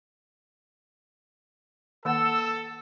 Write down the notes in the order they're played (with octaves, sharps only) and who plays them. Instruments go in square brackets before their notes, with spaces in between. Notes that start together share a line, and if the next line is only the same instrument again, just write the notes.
[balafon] D#3 A#3 F#5 [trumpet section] A4 [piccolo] E6